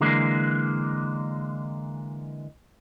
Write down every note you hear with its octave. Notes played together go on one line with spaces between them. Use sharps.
D3 E3 G#3 A#3